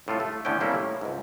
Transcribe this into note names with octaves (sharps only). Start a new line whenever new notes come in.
C2 A2 F4 A4
A3
A2 D3 E3 B3 C#4 G5
A2 C3 G3 A#3 C#4 E4
A2
C#2 G#2